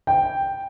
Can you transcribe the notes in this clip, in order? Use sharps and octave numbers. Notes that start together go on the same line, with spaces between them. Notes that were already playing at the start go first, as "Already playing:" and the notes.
G5